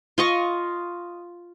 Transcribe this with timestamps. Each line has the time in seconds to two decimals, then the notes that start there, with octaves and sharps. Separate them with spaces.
0.18 F4 D#5 C#6